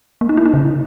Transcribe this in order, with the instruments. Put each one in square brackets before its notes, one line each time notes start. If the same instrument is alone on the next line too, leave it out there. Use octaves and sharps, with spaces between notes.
[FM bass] A#3
D#4
E4
D#4
C#3